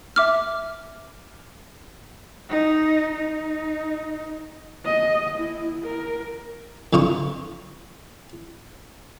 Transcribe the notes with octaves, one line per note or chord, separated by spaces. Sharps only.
E5 D6 F6
D#4
D#4
D#5
E4
A#4
F2 D3 F4 C#6 D#6